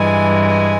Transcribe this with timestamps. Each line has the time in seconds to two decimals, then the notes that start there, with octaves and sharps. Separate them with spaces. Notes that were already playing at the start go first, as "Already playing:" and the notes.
Already playing: G2 E3 G#3 G#5
0.47 G#5